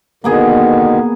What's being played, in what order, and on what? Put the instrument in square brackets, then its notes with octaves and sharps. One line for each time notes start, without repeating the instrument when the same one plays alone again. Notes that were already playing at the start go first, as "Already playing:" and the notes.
[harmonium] B2 D3 D#3 [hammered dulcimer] A#3 B3 G#4